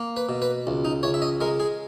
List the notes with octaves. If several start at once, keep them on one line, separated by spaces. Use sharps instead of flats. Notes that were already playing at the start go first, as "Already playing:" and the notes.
Already playing: A#3
B4
B2
B4
C#2
D#4
C#2 C#5
E5
D#5
G#3 A#4
G#4